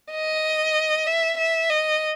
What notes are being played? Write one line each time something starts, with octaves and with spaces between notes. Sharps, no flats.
D#5
E5
E5
D#5